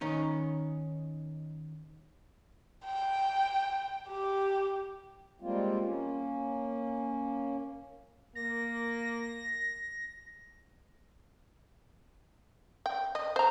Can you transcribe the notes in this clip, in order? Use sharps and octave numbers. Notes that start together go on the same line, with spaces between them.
D#3 C#4 D#4
G5
G4
G3 G#3 A#3 C4 F4
A#3 C#4
A#3 A#6
G5
D#5
C5 A#5